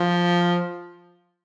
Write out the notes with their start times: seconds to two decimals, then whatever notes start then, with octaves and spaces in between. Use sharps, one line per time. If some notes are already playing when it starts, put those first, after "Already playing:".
Already playing: F3